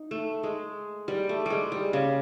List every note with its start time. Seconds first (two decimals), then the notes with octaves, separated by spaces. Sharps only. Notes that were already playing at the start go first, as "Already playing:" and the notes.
Already playing: D#4
0.11 A3
0.43 G#3
1.08 G3
1.29 A3
1.46 G3 G#3
1.72 G3
1.93 C#3